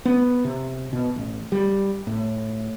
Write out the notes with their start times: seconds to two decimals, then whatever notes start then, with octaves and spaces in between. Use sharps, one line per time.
0.05 B3
0.45 C3
0.93 B2
1.16 A1
1.52 G3
2.07 A2